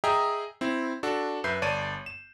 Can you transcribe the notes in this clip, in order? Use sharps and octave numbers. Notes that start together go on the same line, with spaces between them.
G#4 D#5 E5 G5 A#5
C4 E4
D4 F#4 A4
F#2 B4 E5 G6 C7
G1 C#5 D5 A5 D#7
E7